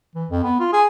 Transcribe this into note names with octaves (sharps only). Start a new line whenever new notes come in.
E3
F2
B3
F4
G#4